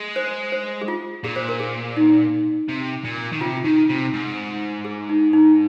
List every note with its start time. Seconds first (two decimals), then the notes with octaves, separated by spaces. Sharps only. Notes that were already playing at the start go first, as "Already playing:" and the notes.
Already playing: G#3
0.16 C5
0.52 C5
0.81 G#4
0.88 F4
1.24 A#2 G#4
1.36 C5
1.49 A#4
1.60 G#4
1.97 D#4
2.69 C3
3.04 A#2
3.32 D#3
3.40 C3 F4
3.57 F4
3.64 D#3 D#4
3.89 C3 F4
4.13 G#2
4.85 G#4
5.09 D#4
5.33 D#4